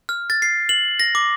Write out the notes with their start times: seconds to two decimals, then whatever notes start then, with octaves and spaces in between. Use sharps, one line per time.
0.09 F6
0.30 A6
0.42 C7
0.69 F#7
1.00 A#6
1.15 D6